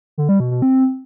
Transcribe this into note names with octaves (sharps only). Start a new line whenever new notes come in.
D3
G3
B2
B2
C4